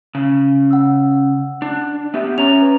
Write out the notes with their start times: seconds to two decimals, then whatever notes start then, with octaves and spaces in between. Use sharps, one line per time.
0.15 C#3
0.71 F#5 E6
1.62 D4
2.14 B3 G4 E5
2.38 C#4 C#5 A#5 F7
2.61 B4